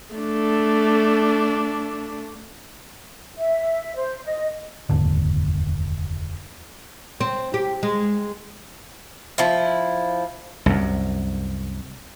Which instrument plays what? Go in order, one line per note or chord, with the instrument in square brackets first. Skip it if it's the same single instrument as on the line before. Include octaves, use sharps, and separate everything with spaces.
[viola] A3 D4
[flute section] E5
C5
D#5
[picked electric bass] F1 D#2 G#2 D3
[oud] C4
G4
G#3
[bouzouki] F3 E4
[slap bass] C2 F#2